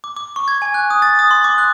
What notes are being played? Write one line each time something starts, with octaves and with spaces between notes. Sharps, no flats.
D6
D6
C#6
G#6
G#5
F#6
D#6
A6
D#6
C6
D6
F#6